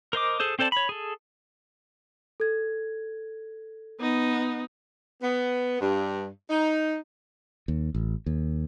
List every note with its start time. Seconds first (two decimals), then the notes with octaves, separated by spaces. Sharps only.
0.13 A#4 C5 D#5 D6
0.40 G#4 A4 C5
0.59 C4 A4 C5 D5 A5
0.72 C#5 B5
0.89 G#4 A4
2.40 A4 G#6
4.00 B3 D#4
5.21 B3
5.80 G2
6.50 D#4
7.68 D#2
7.95 A1
8.26 D#2